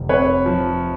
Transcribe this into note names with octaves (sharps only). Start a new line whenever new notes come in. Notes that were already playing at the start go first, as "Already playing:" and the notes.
Already playing: F1
C3 B4 C#5
F3